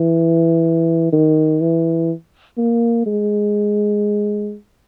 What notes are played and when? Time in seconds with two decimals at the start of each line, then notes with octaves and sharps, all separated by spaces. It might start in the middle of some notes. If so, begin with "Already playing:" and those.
Already playing: E3
1.12 D#3
1.61 E3
2.58 A#3
3.06 G#3